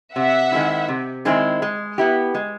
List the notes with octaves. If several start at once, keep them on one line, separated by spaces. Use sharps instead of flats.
C3 E5 F#5
D#3 G#3 C4 E4
C3
D#3 G#3 C4 E4
G#3
B3 E4 G4
G#3